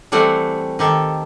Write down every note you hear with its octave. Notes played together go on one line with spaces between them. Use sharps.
E3 G3 A3 C4 F#5
D#3 G4 A4